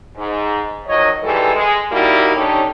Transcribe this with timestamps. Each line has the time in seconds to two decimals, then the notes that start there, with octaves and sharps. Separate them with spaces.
0.16 G#2
0.87 D#3 F3 F#3 C#5 D#5
1.22 G#2 E3 G3 G#3 G#4 A4
1.53 G#3
1.91 G3 A#3 D#4 E4 F#4
2.35 D3 C#4 D#4 G4 A4 C#5